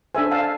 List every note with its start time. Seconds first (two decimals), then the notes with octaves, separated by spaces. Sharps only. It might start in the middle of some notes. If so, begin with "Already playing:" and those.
0.15 D4 A4 C5 E5 G#5
0.32 F5 A5